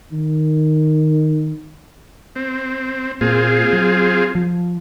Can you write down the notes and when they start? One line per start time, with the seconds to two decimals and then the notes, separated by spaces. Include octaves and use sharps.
0.12 D#3
2.36 C4
3.21 A#2 C4 F4 G#4
3.73 F#3
4.35 F3